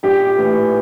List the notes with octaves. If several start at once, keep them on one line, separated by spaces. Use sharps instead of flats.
A#1 G4
A2 E3